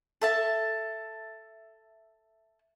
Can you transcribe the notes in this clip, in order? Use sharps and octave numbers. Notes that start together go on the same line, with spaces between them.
A4 E5 A5